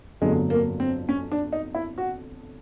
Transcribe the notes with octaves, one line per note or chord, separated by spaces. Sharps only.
G1 F2 D3 F#3 G#3 A3
A#3
C4
C#4
D4
D#4
E4
F#4